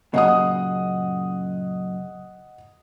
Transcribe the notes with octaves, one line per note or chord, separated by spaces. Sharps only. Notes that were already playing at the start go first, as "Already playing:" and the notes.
F#2 A#2 C#3 D#5 F#5 D#6